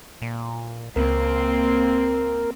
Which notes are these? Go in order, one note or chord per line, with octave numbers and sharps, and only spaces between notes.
A#2
C#2 A#3 C4 A#4